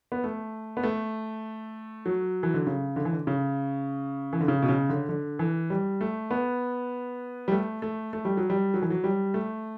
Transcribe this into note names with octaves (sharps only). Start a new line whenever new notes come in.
B3
A3
B3
A3
F#3
E3
D3
C#3
D3
E3
D3
C#3
E3
D3
C#3
B2
C#3
D3
D3
E3
G3
A3
B3
G3
A3
A3
A3
G3
F#3
G3
F#3
E3
F#3
G3
A3